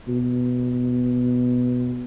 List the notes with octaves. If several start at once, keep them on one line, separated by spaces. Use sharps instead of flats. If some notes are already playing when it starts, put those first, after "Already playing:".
B2